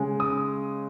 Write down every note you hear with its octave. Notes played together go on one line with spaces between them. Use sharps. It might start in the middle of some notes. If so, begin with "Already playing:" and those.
Already playing: C#3 G#3
D#6